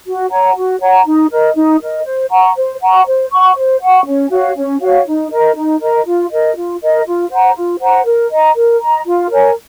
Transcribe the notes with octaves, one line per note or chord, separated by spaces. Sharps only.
F#4
C#5 F#5 A#5
F#4
C#5 F#5 A#5
D#4
A#4 D#5
D#4
A#4 D#5
C5
F#5 A#5 C#6
C5
F#5 A#5 C#6
C5
F#5 C#6
C5
F#5 C#6
C#4
F#4 C#5 F5
C#4
F#4 C#5 F5
D#4
A#4 D#5 A#5
D#4
A#4 D#5 A#5
F4
A#4 D#5
F4
A#4 D#5
F4
C5 F#5 A#5
F4
C5 F#5 A#5
A#4
D#5 A#5
A#4
D#5 A#5
F4
A#4 C#5 G#5